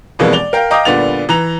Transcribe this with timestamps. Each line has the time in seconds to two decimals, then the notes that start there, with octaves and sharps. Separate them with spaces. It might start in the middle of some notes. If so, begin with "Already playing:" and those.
0.19 F2 B2 E3 G3 G#3 A#3
0.33 D5 F7 G7
0.53 A#4 F5 G5
0.71 D#5 F5 G5 A#5 D6 D#6
0.85 A#2 D3 G3 B3 A6 F7
1.29 E3 A#5 F7